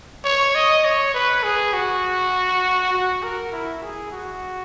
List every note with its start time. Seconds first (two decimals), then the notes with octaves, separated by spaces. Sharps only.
0.25 C#5
0.55 D#5
0.85 C#5
1.14 B4
1.44 G#4
1.74 F#4
2.93 F#4
3.23 A#4
3.52 E4
3.82 G#4
4.12 F#4